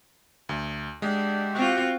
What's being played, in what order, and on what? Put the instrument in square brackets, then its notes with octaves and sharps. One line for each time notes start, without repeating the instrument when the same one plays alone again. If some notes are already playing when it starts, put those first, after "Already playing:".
[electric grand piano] D2
[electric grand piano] G#3 [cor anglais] D4 [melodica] G4 E5 F#5
[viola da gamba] C4 F4 [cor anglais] F#4